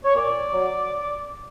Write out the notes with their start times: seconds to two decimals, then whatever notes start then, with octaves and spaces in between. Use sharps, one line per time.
0.04 C#5
0.14 A#2 D5
0.52 F#3